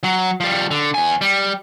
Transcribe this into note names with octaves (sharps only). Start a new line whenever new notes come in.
F#3
F3 G3
D3
E2 G#5
G3